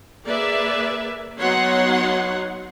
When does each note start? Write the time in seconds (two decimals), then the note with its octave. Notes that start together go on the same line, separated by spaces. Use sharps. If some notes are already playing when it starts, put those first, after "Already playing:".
0.24 A#3 G#4 B4 D5 E5
1.38 F#3 B3 D#4 C#5 F#5 C6